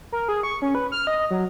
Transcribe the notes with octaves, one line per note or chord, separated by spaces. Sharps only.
A#4
G#4
C#6
C#4
B4
F6
D#5
F#3